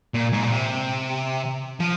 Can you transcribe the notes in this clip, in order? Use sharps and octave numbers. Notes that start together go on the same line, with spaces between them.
A#2
G#2
A#2
C3
F3